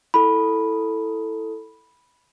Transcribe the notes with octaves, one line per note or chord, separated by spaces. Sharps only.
E4 A4 B5